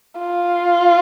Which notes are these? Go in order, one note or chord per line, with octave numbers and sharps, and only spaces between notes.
F4